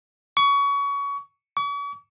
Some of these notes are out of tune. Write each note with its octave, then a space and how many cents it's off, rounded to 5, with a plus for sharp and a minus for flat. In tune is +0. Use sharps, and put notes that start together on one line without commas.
C#6 +25
C#6 +45